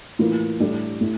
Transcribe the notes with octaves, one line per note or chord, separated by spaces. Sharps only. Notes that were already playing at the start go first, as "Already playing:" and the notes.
A2 E3 A#3 F4
A2 G3 D4 A4
A2